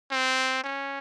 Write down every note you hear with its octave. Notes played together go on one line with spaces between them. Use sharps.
C4
C#4